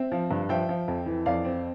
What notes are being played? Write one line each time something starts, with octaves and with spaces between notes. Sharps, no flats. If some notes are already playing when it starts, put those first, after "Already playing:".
Already playing: C4 E5
F3
G2
F3 E5 G5
F3
F2
E3
F2 D5 F5
C4